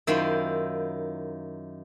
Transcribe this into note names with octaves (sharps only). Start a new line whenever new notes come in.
F#2 D#3 E4 F4 C5